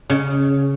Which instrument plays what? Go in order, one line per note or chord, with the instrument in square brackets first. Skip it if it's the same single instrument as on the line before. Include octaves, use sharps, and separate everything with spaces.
[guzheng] C#3